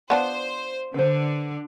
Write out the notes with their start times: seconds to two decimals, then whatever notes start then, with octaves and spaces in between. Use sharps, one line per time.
0.10 B3 D4 F4 C5
0.94 D3 B4 C5